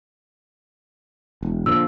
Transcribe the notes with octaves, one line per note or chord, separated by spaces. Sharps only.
E1
A#2 D3 F3 E6